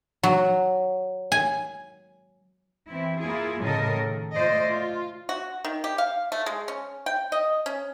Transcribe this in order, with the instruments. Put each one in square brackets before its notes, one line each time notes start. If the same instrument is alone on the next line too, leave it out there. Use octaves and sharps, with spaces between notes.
[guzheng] F#3
G#5
[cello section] E3 C4 E4
A#3 E4 F4 G#4
A2 C#3 F3 A4 A#4 D#5
D#3
A3 F4 C5 D5 D#5
F4
[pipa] F#4
D#3
G4
F5
A3
G#3
C#4
G5
D#5
C#4